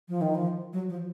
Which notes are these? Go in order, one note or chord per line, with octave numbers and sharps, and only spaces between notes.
F3
D#3
F3
F#3
F3